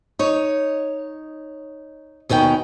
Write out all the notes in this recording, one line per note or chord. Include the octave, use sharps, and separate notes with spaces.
D#4 C#5
D#2 B2 D#3 C#4 G5